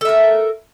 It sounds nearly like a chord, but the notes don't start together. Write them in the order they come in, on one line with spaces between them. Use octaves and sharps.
A4 E5 A#4